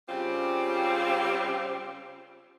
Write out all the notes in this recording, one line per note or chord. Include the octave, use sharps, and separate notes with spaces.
C#3 G3 C4 F4 G4